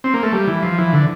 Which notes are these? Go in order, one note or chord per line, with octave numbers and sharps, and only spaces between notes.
C4
A#3
A3
G3
E3
F3
E3
D3